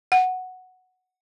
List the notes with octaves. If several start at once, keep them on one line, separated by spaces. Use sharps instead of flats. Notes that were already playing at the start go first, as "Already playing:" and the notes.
F#5